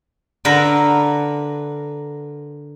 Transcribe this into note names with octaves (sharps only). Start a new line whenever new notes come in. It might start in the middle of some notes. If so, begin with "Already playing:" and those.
D3 A#4 B4 E5